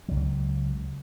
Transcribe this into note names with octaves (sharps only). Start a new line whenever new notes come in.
C#2 F#3